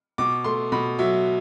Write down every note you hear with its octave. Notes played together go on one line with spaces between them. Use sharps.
B2 D6
A3 C6
B2 B5
F#3 E5